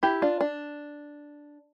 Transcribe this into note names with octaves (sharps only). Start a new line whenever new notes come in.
E4 G4
D4 F4
D4